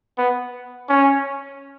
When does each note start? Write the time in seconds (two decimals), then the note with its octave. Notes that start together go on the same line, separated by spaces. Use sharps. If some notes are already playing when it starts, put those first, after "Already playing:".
0.18 B3
0.89 C#4